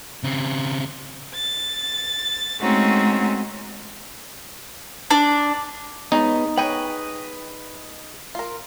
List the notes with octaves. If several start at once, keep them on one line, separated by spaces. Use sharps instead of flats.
C#3 C4
A6
G#3 A3 C4 C#4 D#4 F#4
D4
G#3 B3 D#4 C#5 D#5
G#4 B4 C#5 D#5 G5 B5
F4 A#4